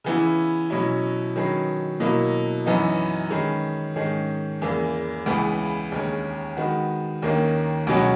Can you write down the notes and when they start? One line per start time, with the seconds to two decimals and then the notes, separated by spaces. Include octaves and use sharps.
0.04 C#3 E3 B3 E4
0.70 B2 F#3 C#4 E4
1.36 D#3 F#3 C#4 G#4 B4
2.00 B2 F#3 A#3 E4
2.66 F#2 E3 B3 D#4
3.30 D#3 G#3 C#4 G#4 B4
3.95 G#2 D#3 G#3 C#4 G#4
4.61 E2 C#3 E3 A#3
5.26 C#2 C#3 E3 B3
5.92 D#2 C#3 G#3 C#4
6.57 D#3 G#3 B3 F#4
7.22 D#2 D#3 A#3 C#4
7.87 C#2 B2 F#3 C#4 F#4